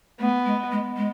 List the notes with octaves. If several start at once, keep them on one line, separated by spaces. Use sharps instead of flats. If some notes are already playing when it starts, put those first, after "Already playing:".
A3 B3
G#3
G#3
G#3